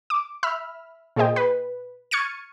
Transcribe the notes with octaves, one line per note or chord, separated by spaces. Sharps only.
D6
E5 B5 E6 F6
A#2 G#4 C5 D#5 G5
B4
C#6 F6 G#6 A6 C#7 D#7